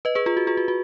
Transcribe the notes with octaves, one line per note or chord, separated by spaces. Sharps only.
B4 D#5
G#4 B4
F4 G#4
F#4
F4 G#4
F#4
F#4